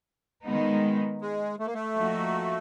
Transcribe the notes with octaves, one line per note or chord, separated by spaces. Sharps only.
D#3 G#3 B3 D#4
G#3
A3
A#3
A3
F3 A#3 D#4 F#4